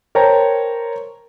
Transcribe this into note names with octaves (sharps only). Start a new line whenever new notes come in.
A#4 C5 C#5 G5 A5 A#5